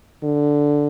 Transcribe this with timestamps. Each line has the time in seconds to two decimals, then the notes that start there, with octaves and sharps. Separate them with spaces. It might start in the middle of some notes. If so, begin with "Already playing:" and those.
0.23 D3